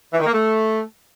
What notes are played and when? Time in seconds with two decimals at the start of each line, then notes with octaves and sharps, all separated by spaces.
0.13 E3
0.20 D#3
0.26 A#3
0.33 A3